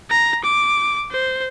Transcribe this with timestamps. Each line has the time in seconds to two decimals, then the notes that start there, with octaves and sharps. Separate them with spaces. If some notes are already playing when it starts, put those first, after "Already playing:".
0.11 A#5
0.44 D6
1.11 C5